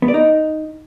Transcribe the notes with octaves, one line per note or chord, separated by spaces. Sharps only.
B3
D5
D#4